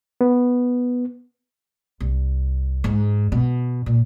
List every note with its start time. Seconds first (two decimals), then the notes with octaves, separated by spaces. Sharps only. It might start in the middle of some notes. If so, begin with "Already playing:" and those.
0.21 B3
2.00 C2
2.84 G#2
3.32 B2
3.86 A#2